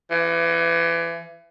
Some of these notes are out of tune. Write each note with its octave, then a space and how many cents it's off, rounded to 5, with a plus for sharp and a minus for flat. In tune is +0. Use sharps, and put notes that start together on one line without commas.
E3 +30